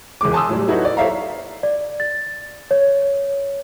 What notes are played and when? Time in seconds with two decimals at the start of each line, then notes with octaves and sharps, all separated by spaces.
0.21 E1 G#3 D6
0.33 G#5 A5 C6 D#6 E6
0.49 A2 F#3 G3
0.68 F#3 D#4 E4 F#4 A4 B4
0.85 D5
0.97 A4 C5 C#5 E5 F5 A#5
1.63 D5
2.00 A6
2.71 C#5